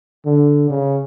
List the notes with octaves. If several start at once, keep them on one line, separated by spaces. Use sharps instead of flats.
D3
C#3